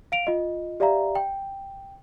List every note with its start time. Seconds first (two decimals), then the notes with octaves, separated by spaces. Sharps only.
0.12 F5 D7 F7
0.27 F4 D#5
0.80 G4 D5 E5 F5 A#5
1.15 G5